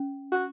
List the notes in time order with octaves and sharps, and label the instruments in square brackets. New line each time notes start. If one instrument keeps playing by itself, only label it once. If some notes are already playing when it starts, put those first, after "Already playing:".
Already playing: [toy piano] C#4
[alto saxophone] F#4